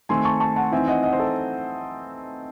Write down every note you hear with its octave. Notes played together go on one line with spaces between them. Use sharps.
D#3 A3 C4 G#5 C6
A5 C#6
A5 C#6
F#5 A5
E3 C4 D#4 E5 G#5
D#5 F#5
D#5 F#5
C5
A4